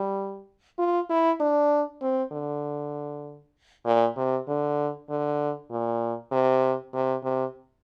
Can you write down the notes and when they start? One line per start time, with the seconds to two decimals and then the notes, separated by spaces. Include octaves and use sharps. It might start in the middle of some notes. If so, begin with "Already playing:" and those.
Already playing: G3
0.78 F4
1.10 E4
1.40 D4
2.02 C4
2.32 D3
3.85 A#2
4.17 C3
4.48 D3
5.09 D3
5.71 A#2
6.32 C3
6.94 C3
7.23 C3